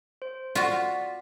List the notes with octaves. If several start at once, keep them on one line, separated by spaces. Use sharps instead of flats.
C5
F4 F#4 D5 B6